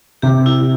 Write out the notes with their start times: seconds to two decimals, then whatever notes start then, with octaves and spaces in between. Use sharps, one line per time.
0.22 C3 G4
0.46 E4